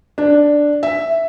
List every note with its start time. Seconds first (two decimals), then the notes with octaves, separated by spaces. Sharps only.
0.18 D4
0.83 E5